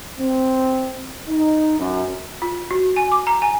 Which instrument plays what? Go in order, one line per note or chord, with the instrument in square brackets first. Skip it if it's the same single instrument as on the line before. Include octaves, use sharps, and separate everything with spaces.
[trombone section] C4
D#4
F#2
[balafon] F4
F#4
G#5
D6
A#5
G#5